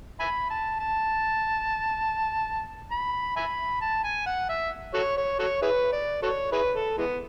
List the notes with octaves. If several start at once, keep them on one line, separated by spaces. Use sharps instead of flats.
E5 G#5 B5
A5
A5
B5
E5 G#5 B5
A5
G#5
F#5
E5
F#4 A4 C#5
C#5
F#4 A4 C#5
E4 G#4 B4
D5
F#4 A4 C#5
E4 G#4 B4
A4
E3 G#3 B3